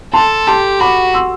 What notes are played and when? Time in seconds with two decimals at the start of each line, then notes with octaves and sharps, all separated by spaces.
0.13 A4 A5 C6
0.47 G4 A5 C6
0.80 F#4 B5 D6
1.14 C6 E6